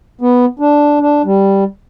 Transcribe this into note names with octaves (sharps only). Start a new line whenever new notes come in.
B3
D4
D4
G3